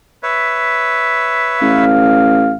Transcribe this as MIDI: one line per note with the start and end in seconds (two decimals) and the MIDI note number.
0.23 1.85 71
0.23 1.85 73
0.23 1.85 76
1.61 2.57 33
1.61 2.57 77